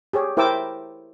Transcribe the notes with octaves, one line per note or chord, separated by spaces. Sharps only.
G4 G#4 C#5
E4 A#4 C5 G5 D6 E6